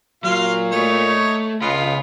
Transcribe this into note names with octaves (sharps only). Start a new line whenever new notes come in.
A#2 F#3 F4 F5 F6
A3 D#4 C#5
C#2 C#3 B3 F4 B5